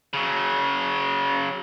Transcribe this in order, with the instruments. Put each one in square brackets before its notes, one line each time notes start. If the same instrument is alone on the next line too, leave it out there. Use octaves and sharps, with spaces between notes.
[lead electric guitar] C#3 F#3